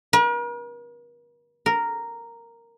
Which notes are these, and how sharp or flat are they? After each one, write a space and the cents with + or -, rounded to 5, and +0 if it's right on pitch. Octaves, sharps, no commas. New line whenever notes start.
A#4 +45
A#4 -5